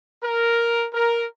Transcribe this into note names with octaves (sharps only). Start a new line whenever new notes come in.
A#4
A#4